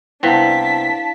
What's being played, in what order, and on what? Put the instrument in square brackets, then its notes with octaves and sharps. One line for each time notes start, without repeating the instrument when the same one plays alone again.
[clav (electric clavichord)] C2 B3 C4 [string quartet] D4 A5 [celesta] E4 F5 [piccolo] B6